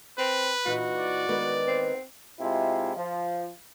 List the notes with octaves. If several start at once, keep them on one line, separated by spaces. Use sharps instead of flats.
C4 B4
A#2 E3 D#4 F#4
D5
D#3 G#3 B3
C4
C3 G#3 E4 F4
F3